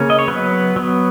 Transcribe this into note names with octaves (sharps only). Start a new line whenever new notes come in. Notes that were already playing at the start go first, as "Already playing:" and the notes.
Already playing: C#3 A#3 C#4
D#5
C#5
F#3 B3 B4
F#3 B3